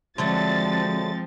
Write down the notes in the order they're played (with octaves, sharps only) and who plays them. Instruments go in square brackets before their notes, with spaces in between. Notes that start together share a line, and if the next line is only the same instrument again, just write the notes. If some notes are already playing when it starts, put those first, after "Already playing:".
[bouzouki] D3 F#3 A3 [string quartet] F3 [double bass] G#3 C4 [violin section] A6